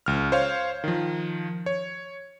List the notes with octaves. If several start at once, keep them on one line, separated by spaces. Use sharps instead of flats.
C#2 F6
C5 C#5 F5
D#3 F3
C#5